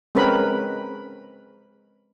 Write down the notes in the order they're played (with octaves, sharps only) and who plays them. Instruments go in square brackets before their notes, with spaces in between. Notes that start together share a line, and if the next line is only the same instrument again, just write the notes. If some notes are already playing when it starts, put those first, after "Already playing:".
[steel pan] G#3 C4 C#4 A#4 B4 B5